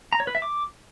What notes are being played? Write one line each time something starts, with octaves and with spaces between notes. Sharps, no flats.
A#5
C#5
B4
E5
D6